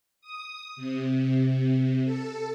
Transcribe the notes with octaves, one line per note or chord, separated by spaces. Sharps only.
D#6
C3
C3
A4